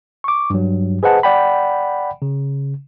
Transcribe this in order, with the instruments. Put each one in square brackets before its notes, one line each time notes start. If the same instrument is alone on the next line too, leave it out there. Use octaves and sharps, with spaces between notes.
[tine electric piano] C#6 D6
G2 F#3
G#4 B4 C5 D#5 F#5 A5
D5 F#5 G5 B5
C#3